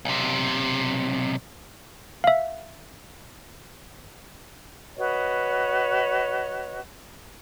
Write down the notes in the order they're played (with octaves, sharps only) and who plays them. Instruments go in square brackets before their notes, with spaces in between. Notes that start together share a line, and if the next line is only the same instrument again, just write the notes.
[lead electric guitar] B1 C3
[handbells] E5 F5
[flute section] F#4 B4 C#5 D#5